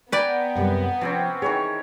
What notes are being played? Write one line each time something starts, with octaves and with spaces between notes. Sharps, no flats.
B3 B4 D5 G5 G#5 A#5
F#2 C3 G3
C3 F3 C4 C#4
D#3 E3 G#4 C#5